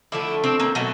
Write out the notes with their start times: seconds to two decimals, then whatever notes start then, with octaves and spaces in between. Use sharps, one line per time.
0.12 D3 F3 A3 D4 E4
0.44 C4 D4
0.59 A#3 C4
0.75 B2 F#3 A3